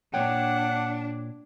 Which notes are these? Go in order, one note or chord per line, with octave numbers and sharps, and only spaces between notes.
A#2 D4 C#5 F#5 G5